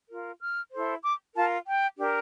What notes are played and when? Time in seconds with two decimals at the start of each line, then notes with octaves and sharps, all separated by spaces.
0.09 F4 A#4
0.41 F6
0.72 E4 A4 C5
1.03 D6
1.35 F4 A#4 A5
1.67 G5
1.98 D4 G4 A#4